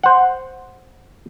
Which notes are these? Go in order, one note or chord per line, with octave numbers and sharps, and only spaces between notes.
C5 F#5